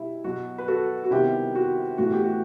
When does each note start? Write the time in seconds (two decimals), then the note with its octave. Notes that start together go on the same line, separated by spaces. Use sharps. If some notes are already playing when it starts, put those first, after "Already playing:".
Already playing: B2 G3 E4
0.24 B2 F#3 B3 F#4
0.58 B4
0.68 F#4 A4
1.04 F#4
1.11 C3 D#3 G3 B3 E4 G4
1.55 F#4
1.98 A2 E3 B3 F#4
2.12 G4
2.24 F#4